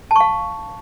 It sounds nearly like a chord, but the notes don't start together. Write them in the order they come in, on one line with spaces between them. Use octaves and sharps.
A5 C#6 F5